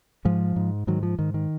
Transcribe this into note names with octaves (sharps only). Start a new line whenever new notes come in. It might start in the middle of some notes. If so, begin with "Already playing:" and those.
G#2 F3 G#3
G#2
G#2 D#3 F#3
F3
G#2 D#3
D#3